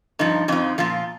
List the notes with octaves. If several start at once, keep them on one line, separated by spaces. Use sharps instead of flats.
G2 F3 D#4
F2 F3 D#4
A#2 F3 F4